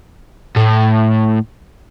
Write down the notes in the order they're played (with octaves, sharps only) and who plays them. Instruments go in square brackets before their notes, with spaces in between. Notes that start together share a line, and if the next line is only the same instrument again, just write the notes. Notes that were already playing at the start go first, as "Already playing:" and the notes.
[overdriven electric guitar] A2